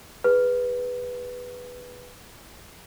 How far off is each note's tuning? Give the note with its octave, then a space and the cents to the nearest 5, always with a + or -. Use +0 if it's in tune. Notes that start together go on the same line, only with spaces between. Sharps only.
G#4 -25 B4 +0